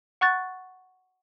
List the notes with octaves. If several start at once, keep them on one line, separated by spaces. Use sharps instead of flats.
F#5 C#6 F#6 A6